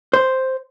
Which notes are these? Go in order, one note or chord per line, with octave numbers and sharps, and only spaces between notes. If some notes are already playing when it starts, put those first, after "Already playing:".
C5